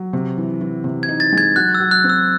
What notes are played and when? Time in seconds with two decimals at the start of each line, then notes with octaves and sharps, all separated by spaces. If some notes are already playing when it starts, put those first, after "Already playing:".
Already playing: F#3
0.13 C3
0.38 E3
0.61 E3
0.84 C3
1.03 G#6
1.09 D#4
1.20 A6
1.33 G#3
1.38 G#6
1.56 F#3 F#6
1.75 E6
1.80 F#3
1.91 F#6
2.04 C4
2.10 E6